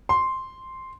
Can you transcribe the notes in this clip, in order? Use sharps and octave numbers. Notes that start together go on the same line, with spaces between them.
C6